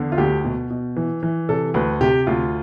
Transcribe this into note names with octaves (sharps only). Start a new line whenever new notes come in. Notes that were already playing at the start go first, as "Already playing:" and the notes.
Already playing: E2 D3
F4
D2 G4
B2
B2
E3
E3
C3 A4
D2 B4
C3 G4
D2 F4